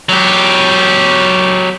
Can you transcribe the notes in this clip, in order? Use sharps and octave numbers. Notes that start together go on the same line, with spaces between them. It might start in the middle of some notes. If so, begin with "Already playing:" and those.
F#3 G4